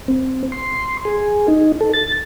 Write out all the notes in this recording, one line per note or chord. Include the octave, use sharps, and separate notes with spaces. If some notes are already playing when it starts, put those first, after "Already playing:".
C4
C6
G#4
D#4
A4
A6